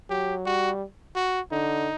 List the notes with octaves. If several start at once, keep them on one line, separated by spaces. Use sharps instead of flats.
F#3 G4
G3 F#4
F#4
D3 D#4